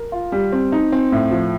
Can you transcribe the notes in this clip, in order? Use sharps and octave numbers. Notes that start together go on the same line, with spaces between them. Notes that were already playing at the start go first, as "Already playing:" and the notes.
Already playing: A#4
F4
G3
C4
D#4
C4
A2
F3